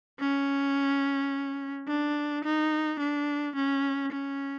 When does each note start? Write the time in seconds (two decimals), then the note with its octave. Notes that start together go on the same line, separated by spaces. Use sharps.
0.20 C#4
1.88 D4
2.44 D#4
3.00 D4
3.56 C#4
4.12 C#4